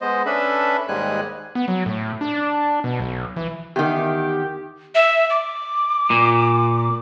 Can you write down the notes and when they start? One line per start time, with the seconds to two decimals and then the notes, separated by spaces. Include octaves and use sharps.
0.01 G#3 B3 C5 D#5
0.26 C#4 D4 A4 B4 E5 B5
0.88 D#2 G#2 G3 G#3 G#5 F#6
1.55 B3
1.68 F#3
1.86 A2
2.21 D4
2.84 B2
3.00 B1
3.36 E3
3.76 E2 D#3 G4
4.95 E5
5.30 D6
6.10 A#2